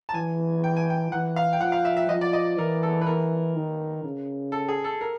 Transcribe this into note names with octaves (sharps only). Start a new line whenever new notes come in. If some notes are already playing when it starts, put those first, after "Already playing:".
A5
E3 G#5
G5
G#5
G5
E3 F#5
F5
G5
F3 F#5
F5
E5
E5
F3 D#5
D5
D#5
E3 A#4
A4
B4
A#4
D#3
C#3
A4
G#4
A4
A#4